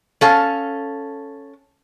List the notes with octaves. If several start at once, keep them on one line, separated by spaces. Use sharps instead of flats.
C#4 A4 F5